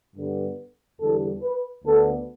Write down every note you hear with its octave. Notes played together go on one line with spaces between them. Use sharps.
G2 D3 G3 B3
E2 D3 G3 A4
B4
D2 D3 B3 A4